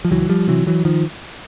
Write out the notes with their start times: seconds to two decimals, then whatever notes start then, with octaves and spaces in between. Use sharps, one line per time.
0.05 F3
0.11 C#2 E3 F#3
0.29 F3 G3
0.48 C3 E3 F#3
0.67 E3 F#3
0.85 D#3 F3